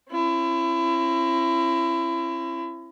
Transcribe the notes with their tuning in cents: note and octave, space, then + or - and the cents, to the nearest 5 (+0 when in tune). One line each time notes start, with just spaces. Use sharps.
C4 +45 E4 +30